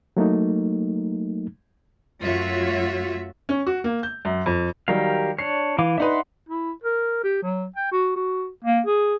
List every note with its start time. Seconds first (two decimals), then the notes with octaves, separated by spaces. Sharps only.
0.17 F#3 A3 A#3 D#4
2.21 F#2 A3 F4 F#4 C#5 E5
3.49 C#4
3.67 F#4
3.84 A#3
4.03 G6
4.25 F#2
4.46 F2
4.88 D#3 F#3 G3 G4 A#4 F5
5.39 D4 C#5 C7
5.78 E3 F5 D6
5.98 D4 D#4 B4 E5 F#5 C6
6.49 E4
6.84 A#4
7.23 G4
7.43 F#3
7.76 G5
7.92 F#4
8.16 F#4
8.64 A#3
8.86 G#4